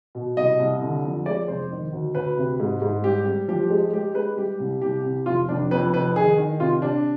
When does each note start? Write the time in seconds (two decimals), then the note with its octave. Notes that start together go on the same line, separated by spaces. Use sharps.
0.15 B2
0.37 C2 D#5
0.59 C2
0.81 D3
1.04 F2
1.26 G#3 D5
1.48 F1 C5
1.71 D#3
1.93 D2
2.15 D2 B4
2.37 C3
2.60 G#2
2.82 G#2
3.04 G3 G4
3.26 G3
3.48 F3 G4
3.70 G#3
3.93 G#3 G4
4.15 G#3 B4
4.37 G3 G4
4.59 C2
4.82 C2 G4
5.04 C3
5.26 F1 F4
5.49 F1 D4
5.71 F2 B4
5.93 F1 B4
6.16 D#3 G#4
6.38 D#3
6.60 C3 F4
6.82 C3 D4